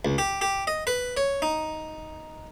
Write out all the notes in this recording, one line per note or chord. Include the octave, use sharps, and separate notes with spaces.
C#2
G4
G4
D#5
B4
C#5
D#4